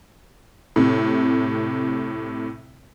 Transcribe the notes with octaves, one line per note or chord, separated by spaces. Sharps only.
A2 C3